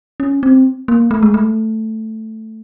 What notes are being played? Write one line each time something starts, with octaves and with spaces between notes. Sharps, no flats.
C#4
C4
A#3
A3
G#3
A3